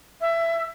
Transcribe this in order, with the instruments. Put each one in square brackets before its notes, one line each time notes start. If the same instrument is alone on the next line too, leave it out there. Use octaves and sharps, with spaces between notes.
[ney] E5